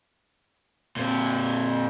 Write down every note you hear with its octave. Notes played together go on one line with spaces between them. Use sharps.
A#2 C4